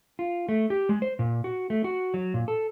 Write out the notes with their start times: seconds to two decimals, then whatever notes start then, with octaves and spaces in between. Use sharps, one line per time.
0.19 F4
0.49 A3
0.70 G4
0.89 G#3
1.02 C5
1.19 A#2
1.44 F#4
1.70 A3
1.84 F#4
2.14 F#3
2.34 A#2
2.48 A4